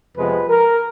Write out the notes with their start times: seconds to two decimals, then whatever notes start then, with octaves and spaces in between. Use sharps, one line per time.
0.16 F2 C3 F3 G#3 B3 B4
0.49 A#4